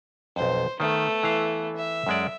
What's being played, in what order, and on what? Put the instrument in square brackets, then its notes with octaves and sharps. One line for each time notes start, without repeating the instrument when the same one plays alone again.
[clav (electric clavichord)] B1 F2 [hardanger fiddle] C5
[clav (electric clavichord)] D#3 [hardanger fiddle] A3 B3
[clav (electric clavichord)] E3 F5
[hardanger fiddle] E5
[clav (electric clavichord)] F#2 G#3 D5